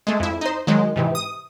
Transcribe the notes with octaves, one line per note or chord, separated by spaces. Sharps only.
G#3 A3
F2 E4
D#4 C5
D#3 F#3 G#3
G#2 C3 E3
D#6